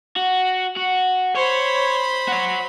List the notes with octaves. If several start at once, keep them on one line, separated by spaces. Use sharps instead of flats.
F#4
F#4
C5 C#5 B5
F#4 C#5